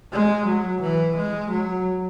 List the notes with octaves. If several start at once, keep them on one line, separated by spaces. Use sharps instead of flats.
G#3
F#3
E3
G#3
F#3